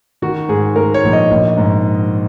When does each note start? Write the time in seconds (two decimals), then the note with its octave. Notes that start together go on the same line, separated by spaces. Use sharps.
0.22 D#3 F#4
0.49 G#2 G#4
0.76 G#2 A#4
0.94 C#5
1.04 A#1
1.13 D#5
1.31 A#1
1.57 G#2